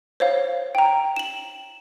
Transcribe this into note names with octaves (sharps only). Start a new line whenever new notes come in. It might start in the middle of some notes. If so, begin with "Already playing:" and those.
C5 C#5 F5
G5 A#5
E7 F#7